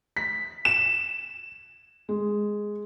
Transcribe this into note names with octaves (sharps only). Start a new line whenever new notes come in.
B6
E7
G#3